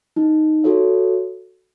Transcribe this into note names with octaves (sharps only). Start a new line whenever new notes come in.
D#4
F#4 A4 C#5 E5